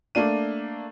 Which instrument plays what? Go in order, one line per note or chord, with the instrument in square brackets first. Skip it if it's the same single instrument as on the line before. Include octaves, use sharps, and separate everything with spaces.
[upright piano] A3 A#3 D4 D#7